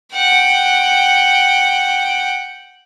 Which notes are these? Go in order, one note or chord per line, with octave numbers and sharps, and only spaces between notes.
F#5 G5